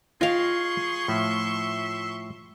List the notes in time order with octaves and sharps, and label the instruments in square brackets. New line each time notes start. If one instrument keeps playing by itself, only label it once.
[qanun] F4 F5 [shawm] G#4 [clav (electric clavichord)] D#5 G5 G#5 [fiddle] C6 C#6
[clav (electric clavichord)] A2 F3 [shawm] E5